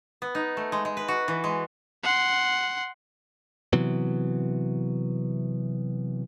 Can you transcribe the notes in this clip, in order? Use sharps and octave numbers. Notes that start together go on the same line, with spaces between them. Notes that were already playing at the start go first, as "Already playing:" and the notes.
B3
D#4
A3
G#3
G#3
B4
F#4
E3
G#3
F#5 C6
C3 E3 F#3 B3